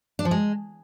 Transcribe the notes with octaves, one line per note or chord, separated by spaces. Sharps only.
D4
F3
G#3